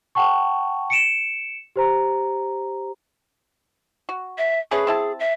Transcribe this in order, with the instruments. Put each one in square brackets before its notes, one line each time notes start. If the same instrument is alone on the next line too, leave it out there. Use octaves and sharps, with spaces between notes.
[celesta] F#5 G5 A5 C#6
C#7 D7 E7
G4 C5 A#5
[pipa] F#4
[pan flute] E5
[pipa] A3 C#4 B4 [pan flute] G#4
[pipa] C4 E4 A5
[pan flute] E5